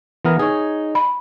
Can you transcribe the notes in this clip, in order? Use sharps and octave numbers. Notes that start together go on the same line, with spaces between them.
E3 B3 A#4
D#4 G#4 C#5
B5